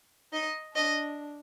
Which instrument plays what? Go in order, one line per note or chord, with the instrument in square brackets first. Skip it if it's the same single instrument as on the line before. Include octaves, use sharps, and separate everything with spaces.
[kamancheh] D#4 [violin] D#5
[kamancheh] D4 [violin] D#5